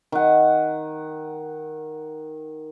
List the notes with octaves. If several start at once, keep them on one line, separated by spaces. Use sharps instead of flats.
D#3 F#5